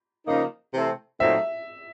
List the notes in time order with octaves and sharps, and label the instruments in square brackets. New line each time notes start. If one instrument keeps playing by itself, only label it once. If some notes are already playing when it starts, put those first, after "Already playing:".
[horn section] C#3 F3 A#3 D#4
C3 E3 A3 C4
[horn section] A#2 F#3 A3 C4 D#4 [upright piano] E5